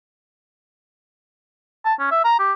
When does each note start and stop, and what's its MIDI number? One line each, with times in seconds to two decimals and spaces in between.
1.85 1.94 81
2.00 2.08 61
2.11 2.20 76
2.24 2.37 82
2.39 2.53 67